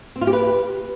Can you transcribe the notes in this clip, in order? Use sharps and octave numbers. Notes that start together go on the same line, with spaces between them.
C4
F4
G4
B4